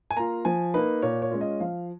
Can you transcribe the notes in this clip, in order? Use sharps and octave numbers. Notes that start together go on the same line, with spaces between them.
G#5
A#3 F4 A#5
F3 G#5
A#3 D#4 B4
A#2 C#5
C#5
G#3 C#4 F4
D#5
F3 F5